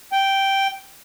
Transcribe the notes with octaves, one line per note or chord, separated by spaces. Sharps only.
G5